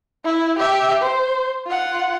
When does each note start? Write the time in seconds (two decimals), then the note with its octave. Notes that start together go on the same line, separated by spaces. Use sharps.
0.25 E4
0.59 G4 E5
1.02 C5
1.67 F4 F#5